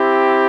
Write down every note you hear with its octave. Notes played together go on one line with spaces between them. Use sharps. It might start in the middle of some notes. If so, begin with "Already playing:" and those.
Already playing: C4 E4 G4